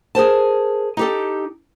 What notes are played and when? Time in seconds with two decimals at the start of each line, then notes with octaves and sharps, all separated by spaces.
0.15 G#4 A#4 C5 A5
0.97 D#4 G4 A4